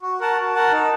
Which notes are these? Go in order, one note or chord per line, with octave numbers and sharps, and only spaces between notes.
F#4
A#4 F#5 A5
F#4
A#4 F#5 A5
D#4